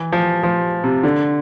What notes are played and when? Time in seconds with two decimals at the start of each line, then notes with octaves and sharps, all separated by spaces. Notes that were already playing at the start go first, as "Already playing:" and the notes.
Already playing: E3
0.12 F3
0.43 F3
0.84 C3
1.04 D3